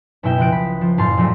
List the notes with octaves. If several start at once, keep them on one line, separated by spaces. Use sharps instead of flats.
F#1 B2 C#4 E4 G5 E7
C#2 F3 F#5 D7
B5
F3
F#1 F2 A2 F5 A5 C6
F2 A#2 F#3 A3